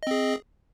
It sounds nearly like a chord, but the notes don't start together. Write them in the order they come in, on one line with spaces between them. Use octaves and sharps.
D#5 C4 G#4